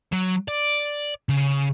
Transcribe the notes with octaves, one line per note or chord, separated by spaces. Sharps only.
F#3
D5
C#3